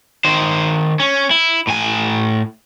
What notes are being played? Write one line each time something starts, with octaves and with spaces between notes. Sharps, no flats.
D#3 C5
C#4
E4
A2 G#5